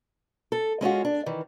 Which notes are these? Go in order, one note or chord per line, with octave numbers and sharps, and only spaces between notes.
A4
G#3 C#4 F4 F#4
D4
D#3 E3